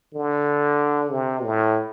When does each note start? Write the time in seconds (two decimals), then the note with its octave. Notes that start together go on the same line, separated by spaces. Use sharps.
0.14 D3
1.11 C3
1.44 A2